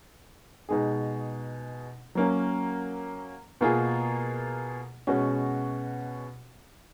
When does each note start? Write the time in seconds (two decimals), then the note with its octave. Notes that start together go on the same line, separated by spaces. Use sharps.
0.69 B2 G#3 D#4 G#4
2.15 F#3 A#3 C#4
3.61 B2 A#3 F4 G#4
5.07 B2 G#3 C#4 F#4